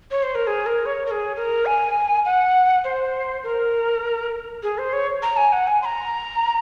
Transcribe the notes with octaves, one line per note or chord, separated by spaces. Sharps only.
C#5
C5
A#4
G#4
A#4
C#5
A#4
G#4
A#4
G#5
F#5
C5
A#4
G#4
C5
C#5
A#5
G#5
F#5
G#5
C6
A#5